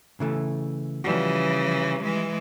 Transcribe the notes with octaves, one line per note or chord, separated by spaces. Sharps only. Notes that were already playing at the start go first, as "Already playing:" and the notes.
C#3 E3 A3
C#3 E3 F3 G3 F#4
E3 G#3